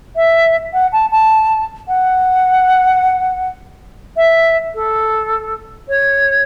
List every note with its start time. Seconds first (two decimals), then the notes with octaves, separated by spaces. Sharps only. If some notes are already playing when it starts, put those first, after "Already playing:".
0.16 E5
0.73 F#5
0.92 A5
1.11 A5
1.88 F#5
4.17 E5
4.75 A4
5.88 C#5